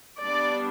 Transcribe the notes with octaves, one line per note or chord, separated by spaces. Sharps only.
G3 B3 D4 D5